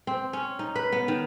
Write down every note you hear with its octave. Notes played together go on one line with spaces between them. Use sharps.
C4
C#4
D#4
B4
B3
D#3